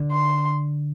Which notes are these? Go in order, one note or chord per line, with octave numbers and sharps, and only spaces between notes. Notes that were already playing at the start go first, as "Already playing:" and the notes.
Already playing: D3
C6